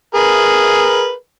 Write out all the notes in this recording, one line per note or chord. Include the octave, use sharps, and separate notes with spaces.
G#4 A#4 B4